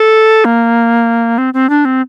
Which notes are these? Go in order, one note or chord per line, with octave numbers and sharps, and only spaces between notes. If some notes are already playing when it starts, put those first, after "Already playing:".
Already playing: A4
A#3
C4
C4
D4
C4